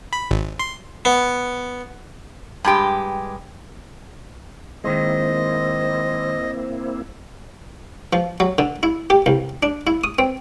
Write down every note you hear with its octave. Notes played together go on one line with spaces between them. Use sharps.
B5
G#1
C6
B3
G2 G#3 G4
D#3 G#3 A#3 C4 E4 C5 D#5
F3
F#3
D3
E4
G4
C2
D4
E4
D#6
C4